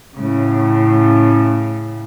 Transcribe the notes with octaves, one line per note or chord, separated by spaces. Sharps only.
A2 C#3